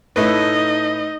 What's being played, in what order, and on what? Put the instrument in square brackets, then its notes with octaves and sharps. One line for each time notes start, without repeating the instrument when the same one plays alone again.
[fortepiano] A2 A3 B4 [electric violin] D#4 D#5